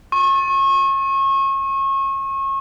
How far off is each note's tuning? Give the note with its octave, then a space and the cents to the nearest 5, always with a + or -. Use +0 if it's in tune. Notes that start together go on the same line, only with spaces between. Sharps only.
C#6 -30